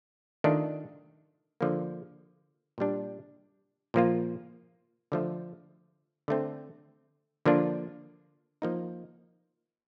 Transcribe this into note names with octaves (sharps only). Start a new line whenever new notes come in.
D#3 A3 D4 F4
D3 F3 A#3
A#2 G3 D4
A#2 F3 A#3 F4
D3 F3 A3
D3 A3 C4
D3 F3 A#3 D4 F4
F3 A#3 D#4